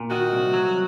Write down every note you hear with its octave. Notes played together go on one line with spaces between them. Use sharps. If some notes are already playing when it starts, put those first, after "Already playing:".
Already playing: A#2
D#3 F#4
C2
F#3